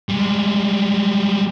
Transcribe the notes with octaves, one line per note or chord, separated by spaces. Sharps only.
G3 G#3